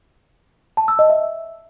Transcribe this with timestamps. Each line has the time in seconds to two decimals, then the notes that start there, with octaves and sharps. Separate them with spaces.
0.77 A5
0.88 E6
0.99 D#5
1.10 E5